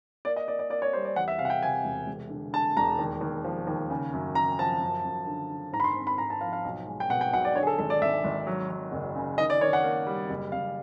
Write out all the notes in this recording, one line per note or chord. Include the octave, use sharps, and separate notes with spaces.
A#3 D5
D#5
A#3 D5
D5
A#3 D5
C#5
G3 C5
D5
E2 F#5
E5
C3 F5
F#5
G5
C3 G#5
E1
E1
D3
D3 A5
E1 A#5
D#2
D#2
F3
D#2
C#3
F#2
C#3 A#5
F3 A5
F#2
F#2
D3
D3
G#2 A#5
B5
C6
C4
B5
G#2 A#5
A5
F3 F5
F5
B1
G#3
G5
B2 F#5
G5
B1 F#5
D5
D3 C#5
G#4
A4
G#1 A4
D5
G#1 E5
G#1
F#3
F#3
F#1
C#3
D#3 D#5
D5
D#3 C#5
F#5
A#3
G3
F#1
F#1 F5